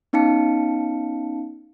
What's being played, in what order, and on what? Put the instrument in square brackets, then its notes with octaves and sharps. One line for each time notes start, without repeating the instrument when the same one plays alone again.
[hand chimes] B3 C#4 D#4 F5 A5 C#7